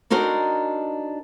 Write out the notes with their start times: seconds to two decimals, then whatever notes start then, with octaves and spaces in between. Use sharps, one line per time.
0.10 D4 D#4 F#4 A#4 C5